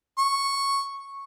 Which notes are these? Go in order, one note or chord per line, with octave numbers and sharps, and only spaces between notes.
C#6